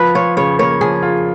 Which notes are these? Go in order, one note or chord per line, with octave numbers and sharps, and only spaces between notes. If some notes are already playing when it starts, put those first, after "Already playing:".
Already playing: F3 F4 B4
F4 C#5
C#3 C#5
A#3 C#5
F3 G#4
F4